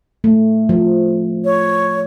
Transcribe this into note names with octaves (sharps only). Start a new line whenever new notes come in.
A3
F3
C#5